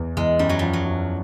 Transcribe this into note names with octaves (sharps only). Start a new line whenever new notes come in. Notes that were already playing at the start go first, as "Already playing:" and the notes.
Already playing: E2 E3
E2 G#3
F#2 G3
F#3
F3 G3
F#3
F#2